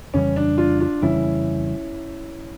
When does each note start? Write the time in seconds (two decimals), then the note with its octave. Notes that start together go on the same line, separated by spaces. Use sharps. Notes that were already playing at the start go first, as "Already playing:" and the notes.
0.14 F2 C#3 E3 G3 C#4
0.36 D4
0.58 D4 F4
0.80 D4 F4
1.02 F2 C#3 E3 G3 C#4 E4